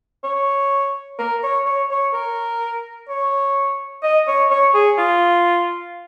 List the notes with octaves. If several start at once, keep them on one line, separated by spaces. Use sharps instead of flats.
C#5
A#4
C#5
C#5
C#5
A#4
C#5
D#5
C#5
C#5
G#4
F4